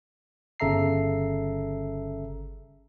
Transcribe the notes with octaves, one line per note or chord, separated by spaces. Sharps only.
G1 C#3 A4 E5 A#5 C7